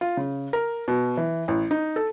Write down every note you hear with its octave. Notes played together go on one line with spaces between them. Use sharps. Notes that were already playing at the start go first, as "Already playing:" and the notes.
F4
C#3
A#4
B2
E3
A1
D#4
A4